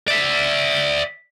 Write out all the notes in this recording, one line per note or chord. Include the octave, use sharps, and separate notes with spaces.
D5 E5